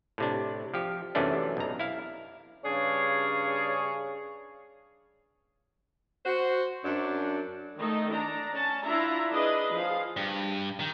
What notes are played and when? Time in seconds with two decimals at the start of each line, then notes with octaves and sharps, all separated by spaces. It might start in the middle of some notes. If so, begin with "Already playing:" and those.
0.18 A2 C3 D4
0.74 F3 G4
1.15 F#2 C3 E3 A3 C#4 D4
1.57 B1 A#5
1.79 E4 F5
2.65 G2 C#3 D4 G#4 C#5 F5
6.25 F#4 C5
6.84 F#2 D4
7.80 D#3 A3 D#4
8.13 D4 A#5
8.54 C#4 A5
8.85 D4 E4 F4 E5 A#5
9.31 D4 G#4 B4 D#5
9.73 F3 G#4 F5
10.17 G2
10.80 D#3